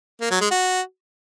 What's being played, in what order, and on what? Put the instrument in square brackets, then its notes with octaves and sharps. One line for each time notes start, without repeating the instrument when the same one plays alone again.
[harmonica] A#3
F#3
G#3
F#4